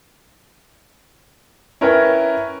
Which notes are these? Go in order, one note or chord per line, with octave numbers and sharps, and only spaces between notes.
C#4 E4 A#4 B4 C#5 G5